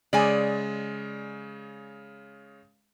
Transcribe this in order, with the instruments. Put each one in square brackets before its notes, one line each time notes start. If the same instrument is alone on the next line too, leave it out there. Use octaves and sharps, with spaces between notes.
[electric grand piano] C#3 G#3 [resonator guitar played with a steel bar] D5 G#5